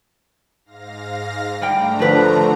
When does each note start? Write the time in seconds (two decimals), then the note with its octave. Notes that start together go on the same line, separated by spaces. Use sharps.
0.65 G#2 F5 A#6
1.62 G3 A3 D4 G5 A#5
1.99 D3 D#3 F3 B4